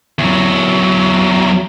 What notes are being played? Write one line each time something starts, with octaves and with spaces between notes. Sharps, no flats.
E2 F#3